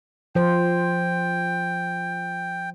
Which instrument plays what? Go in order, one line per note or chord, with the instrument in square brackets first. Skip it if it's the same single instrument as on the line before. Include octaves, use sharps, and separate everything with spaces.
[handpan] F3 C5 [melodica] G5